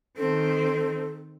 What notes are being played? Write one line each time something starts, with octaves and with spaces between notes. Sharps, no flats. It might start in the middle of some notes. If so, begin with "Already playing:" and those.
D#3 C4 A4